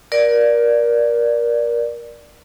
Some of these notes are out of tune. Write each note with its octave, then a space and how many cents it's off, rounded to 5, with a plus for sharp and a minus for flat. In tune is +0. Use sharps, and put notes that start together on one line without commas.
A#4 +25 D5 +0